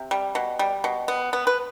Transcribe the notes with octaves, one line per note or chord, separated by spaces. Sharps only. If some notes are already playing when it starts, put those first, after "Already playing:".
Already playing: C3
G3
B2
G3
B2
B3
B3
B4